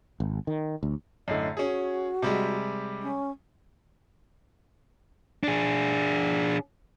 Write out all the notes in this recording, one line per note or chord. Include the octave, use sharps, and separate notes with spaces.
G#1
D#3
D2
F#2 A2 D3 D#5
C#4 F#4 G#4
C3 G3 G#3
C#4
D4 G#4